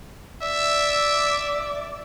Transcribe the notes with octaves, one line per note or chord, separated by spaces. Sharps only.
D5 E5